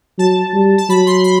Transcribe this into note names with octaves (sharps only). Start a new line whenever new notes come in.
F#3 A5
G3
A5
F#3 B5
C6
B5